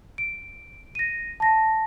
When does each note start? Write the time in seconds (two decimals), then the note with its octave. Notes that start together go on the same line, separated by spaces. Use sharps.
0.18 D7
0.95 A#6 D#7
1.40 A5 A#6